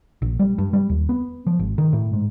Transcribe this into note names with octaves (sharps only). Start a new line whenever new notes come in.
A#1
G3
G2
G3
D#2
B3
F3
G#1
D#3
A2
G#2